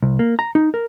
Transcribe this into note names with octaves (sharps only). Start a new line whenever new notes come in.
C2
A#3
A#5
D#4
A#4